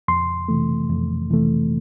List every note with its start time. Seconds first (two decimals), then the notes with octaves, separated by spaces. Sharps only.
0.08 F2 C6
0.48 C3 E3 A3
0.89 F2
1.30 C3 E3 A3